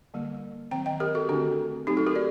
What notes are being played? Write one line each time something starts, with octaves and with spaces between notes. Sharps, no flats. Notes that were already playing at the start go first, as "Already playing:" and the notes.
D3 G3 A#3
D#3 F#3 C4 G5 A#5
D#5 G5
G4 A#4
F#4 A4
D3 A3 C4 D4 F#4
F#3 A3 C4 D#4 G4
F#4 A4
G4 A#4
D5